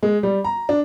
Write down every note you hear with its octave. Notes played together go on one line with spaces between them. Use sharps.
G#3
G3
A#5
D4